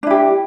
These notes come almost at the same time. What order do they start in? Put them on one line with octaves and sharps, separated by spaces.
D4 E4 G4